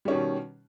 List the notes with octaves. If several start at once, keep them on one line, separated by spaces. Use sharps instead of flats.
B2 D#3 G3 C#4